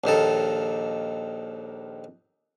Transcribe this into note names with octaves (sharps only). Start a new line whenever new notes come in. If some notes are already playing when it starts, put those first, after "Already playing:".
A#1 D#2 D#3 A4